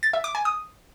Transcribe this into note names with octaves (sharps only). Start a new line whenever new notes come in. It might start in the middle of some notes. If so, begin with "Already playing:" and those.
A6
E5
D6
G#5
D#6